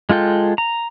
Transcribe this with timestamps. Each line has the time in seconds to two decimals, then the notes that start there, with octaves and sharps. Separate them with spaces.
0.10 G#3 F4 A4 G5
0.58 A#5